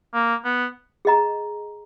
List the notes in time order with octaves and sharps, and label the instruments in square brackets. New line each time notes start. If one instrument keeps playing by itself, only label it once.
[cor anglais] A#3
B3
[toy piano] G#4 D#5 A#5